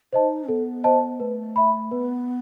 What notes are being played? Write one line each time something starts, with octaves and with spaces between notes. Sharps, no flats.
D#4 C5 D#5 A5
B3 A4
C5 D#5 A5
A3 B4
E5 B5
B3 B4